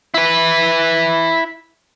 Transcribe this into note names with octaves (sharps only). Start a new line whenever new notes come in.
E4 B4